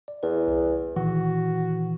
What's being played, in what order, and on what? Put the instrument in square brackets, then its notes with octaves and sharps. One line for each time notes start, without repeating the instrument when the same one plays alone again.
[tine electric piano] D5
[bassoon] E2 [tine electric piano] B4
[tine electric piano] C2
[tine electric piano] A#2 D#3 E3 [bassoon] F#4